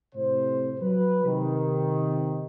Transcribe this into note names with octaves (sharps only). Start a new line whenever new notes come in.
A2 C3 C5
F#3 B4
C3 D#3